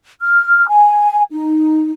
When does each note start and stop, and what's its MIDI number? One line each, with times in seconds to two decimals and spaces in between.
0.21 0.67 89
0.68 1.22 80
1.31 1.91 63